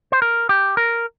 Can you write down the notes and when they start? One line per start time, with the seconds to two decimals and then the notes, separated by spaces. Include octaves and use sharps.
0.12 C5
0.22 A#4
0.49 G4
0.77 A#4